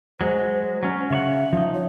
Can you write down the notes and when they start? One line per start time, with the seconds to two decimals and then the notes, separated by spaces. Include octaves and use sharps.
0.21 F#3 G#3 C5
0.83 F#3 C#4
1.10 C#3 C#5 E5 F#5
1.53 F3 D#4
1.74 C#5